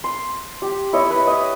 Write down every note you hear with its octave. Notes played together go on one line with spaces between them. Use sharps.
C6
G4
E4 C#5 D#5
B4
D#5